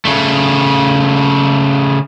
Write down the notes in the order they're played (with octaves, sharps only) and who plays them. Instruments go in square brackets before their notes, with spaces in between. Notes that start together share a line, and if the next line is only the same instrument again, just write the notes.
[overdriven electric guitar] C#3 A3